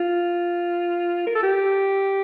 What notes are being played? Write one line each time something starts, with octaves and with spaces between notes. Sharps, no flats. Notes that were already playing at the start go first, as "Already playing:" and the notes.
Already playing: F4
A#4
A4
G4